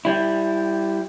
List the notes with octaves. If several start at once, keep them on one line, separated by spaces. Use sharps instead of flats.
G3 E4